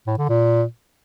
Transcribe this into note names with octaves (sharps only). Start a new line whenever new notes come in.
A2
D3
A#2